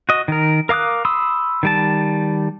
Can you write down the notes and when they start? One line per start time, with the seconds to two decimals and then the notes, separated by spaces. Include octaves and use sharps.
0.09 F#4 D#5
0.28 D#3 A#4
0.69 A#4 F5 D6 D#6 F#6
1.05 B5 C6 D#6 E6
1.63 D#3 G3 A5